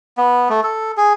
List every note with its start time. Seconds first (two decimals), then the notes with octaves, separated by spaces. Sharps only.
0.18 B3
0.49 A3
0.63 A4
0.97 G#4